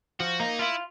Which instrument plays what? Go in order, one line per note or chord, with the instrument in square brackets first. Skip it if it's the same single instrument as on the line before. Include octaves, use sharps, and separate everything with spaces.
[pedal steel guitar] F3 [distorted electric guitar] F#4
[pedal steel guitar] A#3 [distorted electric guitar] D#4
[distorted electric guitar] E4 [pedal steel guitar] F4